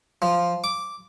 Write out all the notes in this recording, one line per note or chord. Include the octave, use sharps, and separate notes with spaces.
F3
D6